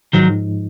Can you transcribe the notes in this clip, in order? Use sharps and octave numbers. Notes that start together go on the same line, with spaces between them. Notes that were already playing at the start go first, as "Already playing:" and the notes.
G#2 D#3 F3 F#3 G#3 D#4